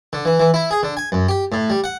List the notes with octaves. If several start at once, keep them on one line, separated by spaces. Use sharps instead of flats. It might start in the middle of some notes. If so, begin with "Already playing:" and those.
D3
E3
E3
E4
G#4
D3
G#5
F#2
G4
A2
G3
F#5